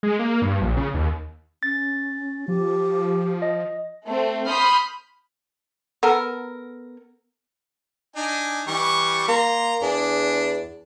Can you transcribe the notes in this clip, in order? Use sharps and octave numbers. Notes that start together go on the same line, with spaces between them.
G#3
A#3
G2
A#1
C#3
D#2
C#4 A6
F3 G4
D#5
A3 C4
B5 C6 D#6 F6 G6
B3 A4 A#4
D4 D#4 G#5
E3 G3 C#6
A#3 A#5 C6
E2 D4 G#4